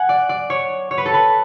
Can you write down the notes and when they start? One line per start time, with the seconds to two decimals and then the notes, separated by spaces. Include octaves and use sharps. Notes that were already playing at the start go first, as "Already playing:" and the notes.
Already playing: F#5 G#5
0.09 D5
0.29 D5
0.50 C#5
0.91 C#5
0.98 B4
1.06 A4
1.14 B4